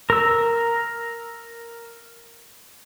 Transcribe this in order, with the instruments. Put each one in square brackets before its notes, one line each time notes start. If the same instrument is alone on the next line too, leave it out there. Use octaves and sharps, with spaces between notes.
[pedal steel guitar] A#4 E6